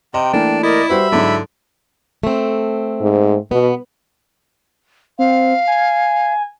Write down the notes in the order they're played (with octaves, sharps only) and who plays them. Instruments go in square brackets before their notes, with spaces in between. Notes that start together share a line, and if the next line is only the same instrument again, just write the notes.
[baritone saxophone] C3 [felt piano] D#5 [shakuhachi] G5
[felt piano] E3 A3 A#3 [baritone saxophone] D4
[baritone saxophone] E4 [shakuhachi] A#4 [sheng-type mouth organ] D5 D#5
[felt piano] G3 F#4 B4 [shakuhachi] C5 [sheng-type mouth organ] E5 B5
[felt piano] G#2 F#3 [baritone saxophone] D3 [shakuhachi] E4
[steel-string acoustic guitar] A3 C4
[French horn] G#2
[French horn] B2 [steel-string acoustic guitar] B3
[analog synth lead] C4 [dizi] F5
[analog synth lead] G#5